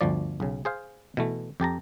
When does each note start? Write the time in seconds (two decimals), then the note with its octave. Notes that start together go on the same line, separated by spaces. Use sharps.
0.01 G1 D2 F3 D5
0.40 B1 C#3
0.65 G#4 C5 F5
1.17 B2 E3 A3
1.60 F2 G4 A5 A#5